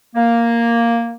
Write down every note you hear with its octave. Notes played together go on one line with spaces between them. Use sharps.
A#3